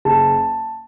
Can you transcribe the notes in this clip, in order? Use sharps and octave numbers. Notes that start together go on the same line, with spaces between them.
F#1 A5